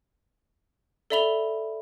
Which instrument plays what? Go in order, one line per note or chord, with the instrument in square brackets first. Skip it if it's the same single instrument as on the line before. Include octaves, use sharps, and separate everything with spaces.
[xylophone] A4 D5 E5 B5 F7 G7